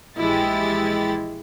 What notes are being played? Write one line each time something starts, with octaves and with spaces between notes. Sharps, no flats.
A#1 E3 G#3 E4 G4 A6